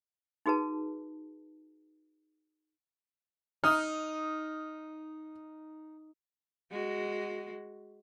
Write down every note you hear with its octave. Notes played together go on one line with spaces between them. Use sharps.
D#4 F#4 G#4 B4 A5
D#4 D#6 F6
G#3 F#4